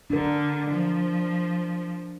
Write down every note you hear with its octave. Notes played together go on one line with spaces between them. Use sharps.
D3 D4 A#4
F3